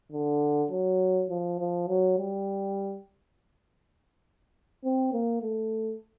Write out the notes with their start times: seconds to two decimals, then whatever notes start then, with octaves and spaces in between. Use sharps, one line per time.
0.12 D3
0.71 F#3
1.30 F3
1.60 F3
1.88 F#3
2.18 G3
4.84 C4
5.13 A#3
5.42 A3